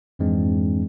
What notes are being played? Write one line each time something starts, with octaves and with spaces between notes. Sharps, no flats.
F2 G#2 E3 G#3 C4 D4